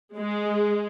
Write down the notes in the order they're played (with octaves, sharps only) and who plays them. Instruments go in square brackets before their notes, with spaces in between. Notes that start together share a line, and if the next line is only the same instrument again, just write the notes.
[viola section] G#3